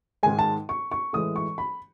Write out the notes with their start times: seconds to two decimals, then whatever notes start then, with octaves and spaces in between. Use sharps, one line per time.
0.23 G#2 D#3 G#3 G#5
0.39 A5
0.69 C#6
0.92 C#6
1.13 A2 E3 G#3 D#6
1.36 C#6
1.58 B5